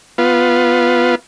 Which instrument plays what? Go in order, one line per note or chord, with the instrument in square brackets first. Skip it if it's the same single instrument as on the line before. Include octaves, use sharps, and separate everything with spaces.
[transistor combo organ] B3 F4